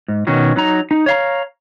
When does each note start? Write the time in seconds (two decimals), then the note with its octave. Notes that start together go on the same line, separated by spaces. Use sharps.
0.08 G#2
0.27 B2 D#3 C#4 F#4
0.56 F#3 D#4 A#5
0.91 D#4
1.06 C#5 F5 A#5